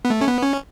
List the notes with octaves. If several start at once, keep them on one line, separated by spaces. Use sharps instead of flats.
B3
A3
C#4
B3
C#4